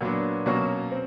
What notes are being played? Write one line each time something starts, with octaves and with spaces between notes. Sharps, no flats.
A#2 F#3 B3 D4
B2 F#3 A#3 C#4 F#4
C4